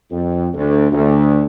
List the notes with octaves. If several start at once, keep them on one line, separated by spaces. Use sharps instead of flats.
F2
D2
D2